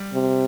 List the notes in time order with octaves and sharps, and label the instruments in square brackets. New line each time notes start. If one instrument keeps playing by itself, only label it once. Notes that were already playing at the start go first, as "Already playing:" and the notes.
Already playing: [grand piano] G3
[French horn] C3